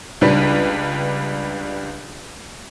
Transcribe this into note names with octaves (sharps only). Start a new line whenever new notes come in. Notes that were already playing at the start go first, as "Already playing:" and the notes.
C#2 G3 D4 B4